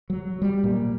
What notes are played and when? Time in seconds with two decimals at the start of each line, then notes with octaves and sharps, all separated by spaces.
0.10 F#3
0.42 G3
0.64 A#2